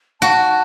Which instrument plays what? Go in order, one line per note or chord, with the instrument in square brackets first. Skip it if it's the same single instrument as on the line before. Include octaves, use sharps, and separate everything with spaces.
[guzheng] F#4 [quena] A5